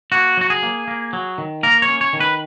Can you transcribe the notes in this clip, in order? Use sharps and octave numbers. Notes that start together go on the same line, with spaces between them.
A#3 F#4
F#3 F#4
G#4
A#3
A#3
F#3
D#3
A#3 A#4
C#5
C#4
C#5
D#3
B4